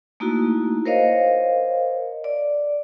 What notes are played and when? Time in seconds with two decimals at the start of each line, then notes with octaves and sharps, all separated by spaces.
0.20 A3 A#3 D#4 E4 F#4
0.85 A#4 C5 C#5 D#5 F5
2.24 D5